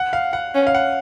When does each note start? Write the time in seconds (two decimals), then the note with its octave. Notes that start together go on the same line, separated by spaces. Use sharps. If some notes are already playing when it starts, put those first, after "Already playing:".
Already playing: F#5
0.13 F5
0.33 F#5
0.54 C#4
0.67 F5
0.75 F#5